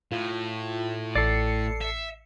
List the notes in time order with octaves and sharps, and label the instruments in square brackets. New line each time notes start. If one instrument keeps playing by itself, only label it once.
[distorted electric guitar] A2 [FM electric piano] F4
[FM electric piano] A1 C7 C#7 [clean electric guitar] A4 D5
[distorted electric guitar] E5